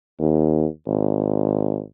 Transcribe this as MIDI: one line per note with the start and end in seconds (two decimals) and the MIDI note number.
0.19 0.67 39
0.87 1.81 32